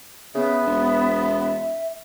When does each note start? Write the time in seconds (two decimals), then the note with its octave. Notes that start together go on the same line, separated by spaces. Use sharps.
0.35 C#3 B3 E5
0.66 E1